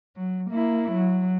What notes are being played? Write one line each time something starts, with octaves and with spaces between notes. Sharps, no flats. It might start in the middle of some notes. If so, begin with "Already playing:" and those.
F#3
A#3 E4
F#3